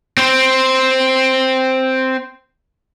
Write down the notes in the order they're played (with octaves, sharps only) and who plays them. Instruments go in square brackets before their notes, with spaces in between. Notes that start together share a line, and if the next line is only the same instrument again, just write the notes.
[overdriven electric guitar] C4 C5